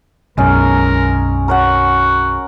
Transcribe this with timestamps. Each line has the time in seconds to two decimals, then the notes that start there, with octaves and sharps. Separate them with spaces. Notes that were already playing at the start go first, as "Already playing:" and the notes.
0.37 B1 F#2 G#3 C#4 A#4
1.48 F#4 A#4 C#5 F#5